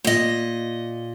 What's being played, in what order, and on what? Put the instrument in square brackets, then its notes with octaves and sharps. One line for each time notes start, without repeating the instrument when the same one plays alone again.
[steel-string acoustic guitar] A#2 D#5